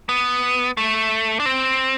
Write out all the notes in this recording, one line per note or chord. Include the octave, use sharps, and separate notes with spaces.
B3
A3
D4
C4